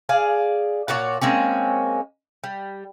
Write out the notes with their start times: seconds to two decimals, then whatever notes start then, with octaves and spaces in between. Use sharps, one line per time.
0.09 G#4 D5 F5
0.88 A#2 F#4 C#5 D5
1.21 G#3 A#3 C4 C#4
2.44 G3